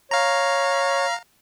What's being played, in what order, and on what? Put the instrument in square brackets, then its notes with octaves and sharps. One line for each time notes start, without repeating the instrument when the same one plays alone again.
[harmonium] C#5 [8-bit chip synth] F5 A#5